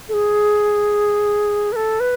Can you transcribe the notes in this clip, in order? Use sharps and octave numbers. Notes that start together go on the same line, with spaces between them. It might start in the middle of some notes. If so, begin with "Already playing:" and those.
A4
G#4
B4
A4
B4